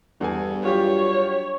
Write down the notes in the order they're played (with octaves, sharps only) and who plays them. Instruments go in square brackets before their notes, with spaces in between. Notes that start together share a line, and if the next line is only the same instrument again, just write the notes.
[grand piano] E2 A4 G#5 [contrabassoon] G2
[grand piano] F#3 F4 G4 [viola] C#5